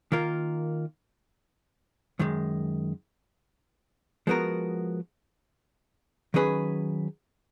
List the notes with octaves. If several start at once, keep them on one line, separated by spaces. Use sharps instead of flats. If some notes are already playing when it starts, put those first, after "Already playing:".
D#3 A#3 F4 A#4
F#2 D#3 G#3
F3 G#3 B3 F#4 A#4
D#3 F#3 C#4 G#4 B4